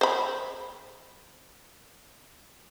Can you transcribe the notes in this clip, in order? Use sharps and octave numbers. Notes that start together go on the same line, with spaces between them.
C5 B5